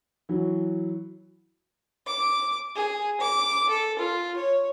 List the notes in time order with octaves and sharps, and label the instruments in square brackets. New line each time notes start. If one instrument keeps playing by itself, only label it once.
[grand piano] E3 F#3
[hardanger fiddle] D6
G#4
D6
A4
F4
C#5